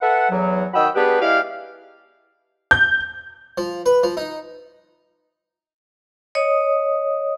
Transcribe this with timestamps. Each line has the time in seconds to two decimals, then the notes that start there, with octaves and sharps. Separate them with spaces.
0.01 A4 B4 E5 F#5
0.30 E2 F#3
0.74 D#3 F#4 D#5 G5 B5 E6
0.95 B3 D4 G4 G#4 B4
1.20 G#3 E4 G4 D5 F5
2.71 G6
3.58 F3
3.86 B4
4.03 F3
4.17 D#4
6.35 C#5 D#5 D#6